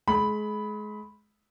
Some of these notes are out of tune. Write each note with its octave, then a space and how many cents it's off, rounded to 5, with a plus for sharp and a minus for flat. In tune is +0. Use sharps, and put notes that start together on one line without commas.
G#3 +30 B5 +0